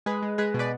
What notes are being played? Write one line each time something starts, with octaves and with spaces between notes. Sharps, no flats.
G#3 G#4 B4
G#3
G#3 G#4 B4
B2
B4 D5